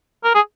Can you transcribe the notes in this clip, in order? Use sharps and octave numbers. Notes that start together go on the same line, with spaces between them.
A#4
G#4